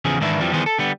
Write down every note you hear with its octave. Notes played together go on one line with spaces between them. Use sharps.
E2 C#3 E3 F3 G#4
G#2 D#3 E3 D4 E4
F2 E3 F3 G3
D#3 E3 G3 B3 G#4 C5
A4
D3 G3 B3